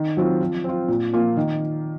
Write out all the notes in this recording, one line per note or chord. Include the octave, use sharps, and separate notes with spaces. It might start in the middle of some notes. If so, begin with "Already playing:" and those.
Already playing: D#3
F#3 C4 F4
F3
C4 F4
A#2
F3 A#3 F4
D#3